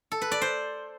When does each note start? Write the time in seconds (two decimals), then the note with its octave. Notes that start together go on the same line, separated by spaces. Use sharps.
0.12 A4
0.22 B4
0.32 D5
0.42 C5